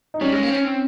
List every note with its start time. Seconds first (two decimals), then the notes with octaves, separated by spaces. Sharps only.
0.14 D#4
0.21 G3 C#4
0.32 G#3
0.43 A#3
0.49 C4
0.54 C#4
0.65 C4